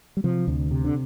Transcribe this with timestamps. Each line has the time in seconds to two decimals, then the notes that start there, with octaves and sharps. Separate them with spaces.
0.17 G3
0.24 C3 F3
0.48 D2
0.71 C3
0.85 D3